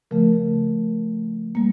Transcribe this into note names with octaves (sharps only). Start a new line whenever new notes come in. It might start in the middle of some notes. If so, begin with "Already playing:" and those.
C#3 F3 A3 A#4
G3 A#3